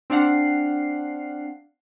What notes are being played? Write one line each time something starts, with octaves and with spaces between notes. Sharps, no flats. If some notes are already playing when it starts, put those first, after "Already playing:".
C4 D4 F5 F#5 C7